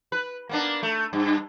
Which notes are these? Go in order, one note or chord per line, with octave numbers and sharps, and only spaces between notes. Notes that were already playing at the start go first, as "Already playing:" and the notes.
B4
A#3 B3 D4
A3
G2